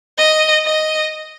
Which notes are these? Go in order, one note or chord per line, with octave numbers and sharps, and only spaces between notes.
D#5
D#5